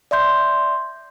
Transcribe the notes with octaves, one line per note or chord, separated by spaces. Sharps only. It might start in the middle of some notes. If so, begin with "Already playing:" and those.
D5 E5 C6 G6